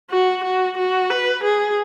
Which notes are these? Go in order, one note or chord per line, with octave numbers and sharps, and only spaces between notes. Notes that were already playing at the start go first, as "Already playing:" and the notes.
F#4
F#4
F#4
B4
G#4